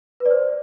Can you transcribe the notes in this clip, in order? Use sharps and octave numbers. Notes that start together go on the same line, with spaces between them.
B4
D5
C5